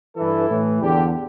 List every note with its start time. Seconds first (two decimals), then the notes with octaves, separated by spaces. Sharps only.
0.16 G2 E3 E4 A4
0.49 A2 E3
0.81 E2 D3 D4 G4